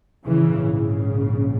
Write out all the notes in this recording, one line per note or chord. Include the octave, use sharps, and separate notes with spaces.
A#1 G#2 C#3 E3
C#3